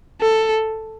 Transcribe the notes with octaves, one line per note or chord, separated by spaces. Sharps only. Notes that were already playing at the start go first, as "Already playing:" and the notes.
A4